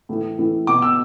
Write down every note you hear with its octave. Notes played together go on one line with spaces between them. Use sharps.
A2 E3
A2 E3
B2 D6
E6